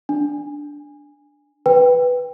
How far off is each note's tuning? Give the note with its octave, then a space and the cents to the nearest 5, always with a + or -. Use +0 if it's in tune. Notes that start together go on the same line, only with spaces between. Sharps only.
D4 +0 G#5 -15
B4 +0 G5 +15